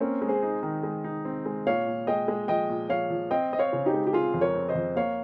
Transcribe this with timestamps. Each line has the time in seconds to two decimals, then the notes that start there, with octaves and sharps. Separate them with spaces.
0.01 A#3 C4 C#4
0.22 G#3
0.28 G#4 C5
0.42 D#4
0.63 D#3
0.83 G#3
1.04 D#4
1.25 C4
1.46 G#3
1.67 A#2 C#5 F5
1.86 A#2
2.07 G#3 D#5 G5
2.28 G#3
2.48 F3 D#5 G5
2.69 A#2
2.89 F3 C#5 F5
3.10 F3
3.31 C4 D#5 G5
3.52 C4 D#5
3.59 C#5 F5
3.73 C#3
3.86 D#4 G4
3.94 G#3
4.07 G4
4.13 C4 F4 G#4
4.34 F2
4.41 A#4 C#5
4.55 C4
4.69 C5 D#5
4.75 F2
4.96 A#3 C#5 F5